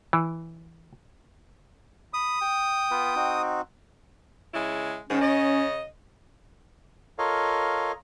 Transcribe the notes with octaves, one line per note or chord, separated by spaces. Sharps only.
E3
B5 D#6
G5
B3 F4 B4
C4 D#4 F#4
C#3 G#3 E4
G#2 D#3 C#4
C#3 D#5
F4 A4 A#4 C#5 D#5 F5